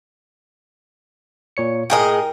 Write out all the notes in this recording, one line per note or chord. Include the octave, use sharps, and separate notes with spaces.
A#2 C#5 C#7
A2 G#4 A#4 D#5 G5